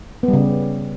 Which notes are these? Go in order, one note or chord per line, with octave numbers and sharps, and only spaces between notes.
B3
G3
C#3